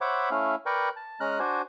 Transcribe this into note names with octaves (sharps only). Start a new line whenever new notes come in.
C5 C#5 E5 F#5 B5 D6
A3 C#4 E4 F5
A#4 B4 D5 G5 A#5 C#6
A5
G#3 C#4 A#5 F6 F#6
D4 F#4 C5 G#5